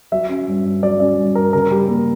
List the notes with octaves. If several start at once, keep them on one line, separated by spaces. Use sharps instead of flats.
F#3 E5
C#4
G2
G2
F#3 D5
C#4 D5
G2
G2 A#4
C#3 A#4
G3
A#3